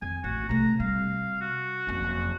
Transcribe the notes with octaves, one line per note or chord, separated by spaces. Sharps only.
F2 G#5
A1 F#4
C3 A3 A#5
C3 G3 F5
F#4
F#1 F2